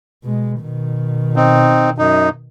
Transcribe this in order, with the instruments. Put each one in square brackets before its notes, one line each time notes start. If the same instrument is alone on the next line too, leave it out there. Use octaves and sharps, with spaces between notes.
[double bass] B2 G#3
B2 D#3
[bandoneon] C4 D#4
F#2 D#4